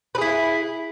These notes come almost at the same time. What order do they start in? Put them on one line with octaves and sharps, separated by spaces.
B4 G#4 E4